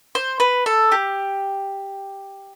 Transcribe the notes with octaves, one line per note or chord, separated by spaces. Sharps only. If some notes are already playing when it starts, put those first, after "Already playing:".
C5
B4
A4
G4